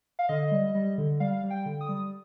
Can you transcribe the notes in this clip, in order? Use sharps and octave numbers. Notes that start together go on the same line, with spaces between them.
F5
D3 D#5
G3
G3
D3
G3 F5
G3
G5
D3
D#6
G3